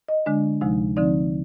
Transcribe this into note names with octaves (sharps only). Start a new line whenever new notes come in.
D#5
D3 G#3 D4
D2 C3 F3 G#3 D#4
D3 F3 C4 D#4 D5